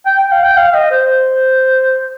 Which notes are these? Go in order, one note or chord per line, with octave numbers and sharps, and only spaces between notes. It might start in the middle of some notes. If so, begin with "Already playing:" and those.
G5
G5
F5
G5
F5
D#5
C5